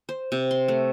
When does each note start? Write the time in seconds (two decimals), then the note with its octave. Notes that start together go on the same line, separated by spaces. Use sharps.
0.09 C5
0.32 C3
0.51 C6
0.68 A3